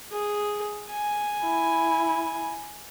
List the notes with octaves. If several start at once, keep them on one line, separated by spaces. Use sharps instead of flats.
G#4
G#5
E4